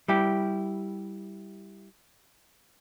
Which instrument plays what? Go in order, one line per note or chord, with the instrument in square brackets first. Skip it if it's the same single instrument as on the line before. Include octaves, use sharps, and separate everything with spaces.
[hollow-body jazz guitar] G3 E4 G4